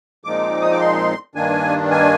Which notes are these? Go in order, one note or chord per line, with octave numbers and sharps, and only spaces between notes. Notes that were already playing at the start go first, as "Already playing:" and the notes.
A#2 F3 G#3 C4 D#4 D6
D#6
D6
C6
G2 D#3 A#3 D4 G#5
G#5